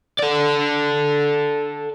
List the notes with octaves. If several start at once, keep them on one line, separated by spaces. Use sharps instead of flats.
A4 D5